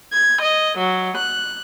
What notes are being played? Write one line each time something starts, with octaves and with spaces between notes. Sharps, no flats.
G#6
D#5
F#3
F#6